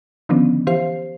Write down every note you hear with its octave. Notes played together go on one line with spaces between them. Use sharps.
D3 D#3 F3 B3 C#4 D4
E3 G4 C5 F5 C7